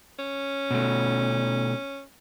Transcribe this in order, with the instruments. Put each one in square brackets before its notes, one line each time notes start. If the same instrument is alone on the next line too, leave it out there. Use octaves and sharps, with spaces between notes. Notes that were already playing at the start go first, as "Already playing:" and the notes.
[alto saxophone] C#4
[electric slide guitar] B2 A3